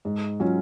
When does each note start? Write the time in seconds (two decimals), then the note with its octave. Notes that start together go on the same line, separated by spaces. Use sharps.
0.05 G#2
0.40 F#3 C#4 F4